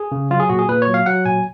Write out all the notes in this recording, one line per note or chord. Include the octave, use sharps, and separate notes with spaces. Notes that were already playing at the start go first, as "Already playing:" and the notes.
Already playing: G#4
C#3
F#3 F4
G#4
A#2 F#4
G#4
A#2 B4
C#5
F#3
F5
F#3 F#5
A#2 G#5